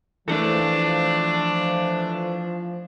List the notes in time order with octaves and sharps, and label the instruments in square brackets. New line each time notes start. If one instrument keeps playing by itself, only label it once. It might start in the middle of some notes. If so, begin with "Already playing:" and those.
[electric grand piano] E3 A3 [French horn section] F3 [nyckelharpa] D4